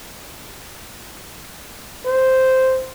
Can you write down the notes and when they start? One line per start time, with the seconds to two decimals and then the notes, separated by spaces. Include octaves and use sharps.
2.06 C5